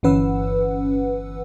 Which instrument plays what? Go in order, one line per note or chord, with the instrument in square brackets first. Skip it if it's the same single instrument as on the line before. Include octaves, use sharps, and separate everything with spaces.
[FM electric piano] G1 E3 C#4 B4 F#5 E6